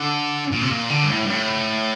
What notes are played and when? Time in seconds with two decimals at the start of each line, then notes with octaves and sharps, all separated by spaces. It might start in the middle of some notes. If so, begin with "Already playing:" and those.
Already playing: D3
0.51 A#2
0.62 C3
0.70 A#2
0.90 D3
1.03 G2
1.10 A2
1.24 G2
1.30 A2